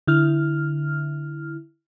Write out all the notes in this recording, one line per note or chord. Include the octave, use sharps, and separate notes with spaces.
D3 E4 F6